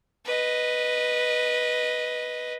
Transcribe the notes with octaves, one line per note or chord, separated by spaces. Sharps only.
B4 D#5